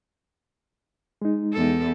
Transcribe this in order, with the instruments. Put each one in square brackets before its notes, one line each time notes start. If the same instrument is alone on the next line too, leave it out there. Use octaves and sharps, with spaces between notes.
[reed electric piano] G#3 D#4
[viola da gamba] E2 A4